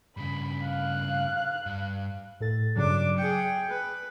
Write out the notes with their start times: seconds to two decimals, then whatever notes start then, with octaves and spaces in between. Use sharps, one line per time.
0.17 G2 C#3 B5
0.66 F5 F#6
1.66 G2
2.40 A2 A4 A6
2.76 G2 C#3 F#3 D4 D6
3.18 G#4 G5 C#7
3.70 B4